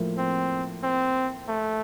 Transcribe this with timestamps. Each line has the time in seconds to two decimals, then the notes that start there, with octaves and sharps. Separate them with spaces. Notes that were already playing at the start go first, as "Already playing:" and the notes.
Already playing: A2 F3 A#3
0.18 C4
0.83 C4
1.48 A3